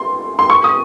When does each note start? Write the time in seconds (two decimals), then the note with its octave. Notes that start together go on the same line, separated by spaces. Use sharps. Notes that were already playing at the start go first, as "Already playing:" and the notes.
Already playing: C6
0.39 C6
0.50 C#6
0.64 D#6